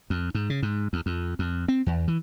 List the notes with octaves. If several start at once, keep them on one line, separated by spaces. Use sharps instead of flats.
F2
G#2
C#3
G#2
E2
F2
F2
C4
E2
E3